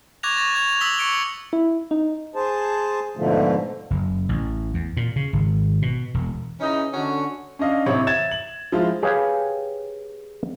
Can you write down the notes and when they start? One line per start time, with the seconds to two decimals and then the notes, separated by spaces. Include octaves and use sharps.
0.23 C#6 D6 F#6 G#6 A#6 F7
0.37 C#6 A6 A#6
0.55 C#6 G#6 A#6 F7
0.69 F7
0.81 D#6 E6 B6 F#7 G7
0.98 C#6 C#7 D7 G7
1.53 E4
1.91 D#4
2.35 G#4 C5 A5
3.17 G#2 B2 D3 F3 A3
3.90 F#1
4.29 A1
4.74 E2
4.97 A#2
5.16 C#3
5.33 G#1
5.82 B2
6.14 E1
6.60 C#3 E3 C#4 D#4
6.94 D3 C#4 F#4
7.59 C#4 D4 D#5 F5
7.86 A1 C3 E4 C#5
8.07 E5 G#6 A6 E7
8.31 F#7
8.72 F3 G#3 E4 F4
9.03 G4 G#4 B4 C#5 F5